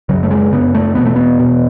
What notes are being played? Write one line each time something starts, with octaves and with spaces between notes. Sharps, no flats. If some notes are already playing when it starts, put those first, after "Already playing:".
F#2 C#3 F#3
A3
G#3
F#2 C#3 B3
A3
E2 B2 B3
A3
B3
E2 B2